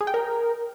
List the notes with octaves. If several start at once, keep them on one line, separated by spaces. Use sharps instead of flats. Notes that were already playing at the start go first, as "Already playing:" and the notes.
G#4
G5
A#4